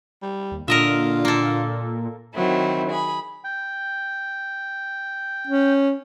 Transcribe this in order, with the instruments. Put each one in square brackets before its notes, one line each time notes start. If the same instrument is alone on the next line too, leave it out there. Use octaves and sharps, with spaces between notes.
[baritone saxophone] G3
[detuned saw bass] D#2
[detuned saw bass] A#2 [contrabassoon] D3 [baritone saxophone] F4 [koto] A#4 D#5 E5
[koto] A#3 A4
[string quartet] D#3 F#3 C4 E4
G#4 B5
[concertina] G5
[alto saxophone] C#4